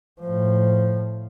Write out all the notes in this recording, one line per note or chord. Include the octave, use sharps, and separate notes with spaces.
A2 F3